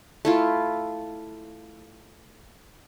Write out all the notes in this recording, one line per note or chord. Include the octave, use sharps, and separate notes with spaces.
A3 E4 F4